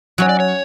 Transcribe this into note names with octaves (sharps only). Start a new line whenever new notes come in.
F#3 C#4 F#4 C#5
D5
C#5